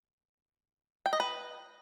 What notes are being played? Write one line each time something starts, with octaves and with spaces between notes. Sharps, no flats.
G5
D#5
B4